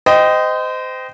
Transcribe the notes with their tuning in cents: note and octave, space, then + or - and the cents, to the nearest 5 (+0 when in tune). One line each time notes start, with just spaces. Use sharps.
C5 -30 D#5 +0 G5 +0